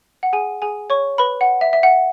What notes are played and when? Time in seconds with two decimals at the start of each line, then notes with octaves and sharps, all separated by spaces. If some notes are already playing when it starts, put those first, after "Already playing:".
0.23 F#5
0.33 G#4 G#5
0.62 G#4 G#5
0.90 C#5 C#6
1.18 B4 B5
1.41 F#5
1.61 E5
1.73 E5
1.83 F#5